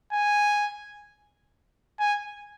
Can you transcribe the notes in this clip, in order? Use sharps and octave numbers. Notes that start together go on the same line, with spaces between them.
G#5
G#5